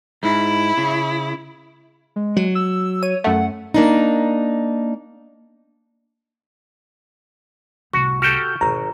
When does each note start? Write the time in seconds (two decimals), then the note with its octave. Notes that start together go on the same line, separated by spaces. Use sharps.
0.23 G#2 E4
0.77 C#3
2.16 G#3
2.37 F#3
2.55 E6
3.03 C#5 D#7
3.24 F#2 A3 F#5
3.74 A#3 D4 D#4
7.93 C2 A2 F#4 C#6
8.22 F#4 G4 A4 F6 G6
8.61 G#1 E2 B2 A#5